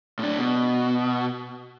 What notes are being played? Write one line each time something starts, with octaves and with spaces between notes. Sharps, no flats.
A2 D4
B2